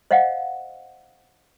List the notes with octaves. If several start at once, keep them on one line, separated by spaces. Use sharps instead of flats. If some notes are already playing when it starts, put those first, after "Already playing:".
C5 D#5 F5 F#5